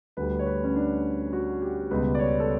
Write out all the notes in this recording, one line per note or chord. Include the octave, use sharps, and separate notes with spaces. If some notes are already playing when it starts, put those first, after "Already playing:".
D2 D3 G3 B4
C#5
B4
C#4
D4
F#4
G4
C#2 B2 G3 B4
D5
C#5
A4